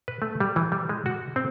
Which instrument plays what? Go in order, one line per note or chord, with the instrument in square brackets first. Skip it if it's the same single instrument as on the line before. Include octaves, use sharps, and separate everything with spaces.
[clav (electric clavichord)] B4
A3
G3
E3
G3
G#3
F#4
C4